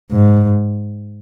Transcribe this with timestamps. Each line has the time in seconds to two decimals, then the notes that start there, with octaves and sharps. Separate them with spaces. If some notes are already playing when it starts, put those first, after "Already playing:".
0.12 G#2